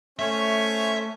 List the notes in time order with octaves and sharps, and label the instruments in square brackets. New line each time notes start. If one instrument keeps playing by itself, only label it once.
[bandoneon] A3 [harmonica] C#4 C5 C#5 [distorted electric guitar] E5